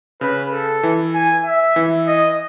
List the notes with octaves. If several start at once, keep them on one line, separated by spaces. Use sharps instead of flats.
C#3 B4
A4
E3
G#5
E5
E3
D#5